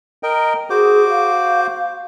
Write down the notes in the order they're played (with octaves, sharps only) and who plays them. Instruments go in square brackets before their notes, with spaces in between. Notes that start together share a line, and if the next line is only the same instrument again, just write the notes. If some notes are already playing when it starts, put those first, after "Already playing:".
[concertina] A#4 D#5 G5
[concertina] F#4 C5 D6 [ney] G#4
[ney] F5